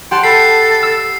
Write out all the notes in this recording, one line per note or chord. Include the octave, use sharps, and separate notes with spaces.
G4 F#5 A5 C6
A4 B5 C7
E6